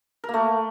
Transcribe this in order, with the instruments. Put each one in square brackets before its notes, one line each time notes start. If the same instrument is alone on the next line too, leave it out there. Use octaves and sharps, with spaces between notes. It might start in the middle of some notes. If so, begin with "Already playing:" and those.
[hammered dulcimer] A#4
A#3
A3